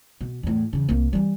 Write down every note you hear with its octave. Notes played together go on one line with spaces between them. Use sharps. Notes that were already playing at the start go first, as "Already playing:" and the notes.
B2
E2 A2
E2 C#3
C2 A#3
E3 G3